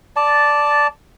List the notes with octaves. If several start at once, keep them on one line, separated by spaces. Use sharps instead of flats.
D5 A5